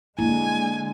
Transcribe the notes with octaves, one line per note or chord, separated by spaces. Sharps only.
D3 G#3 A#3 D4 E4 G#5